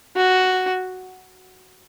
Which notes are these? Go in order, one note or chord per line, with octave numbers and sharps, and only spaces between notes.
F#4